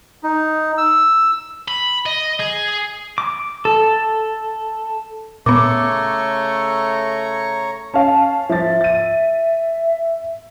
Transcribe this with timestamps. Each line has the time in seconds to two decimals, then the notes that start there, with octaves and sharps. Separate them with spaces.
0.23 D#4
0.78 E6
1.68 B5
2.06 D#5
2.40 G#4
3.18 D6
3.65 A4
5.46 A#2 C#3 A3 B3 C#5 A#5 C#6 D6
7.94 C#4 F5 A5
8.49 F3 E5 A6
8.81 A6 D#7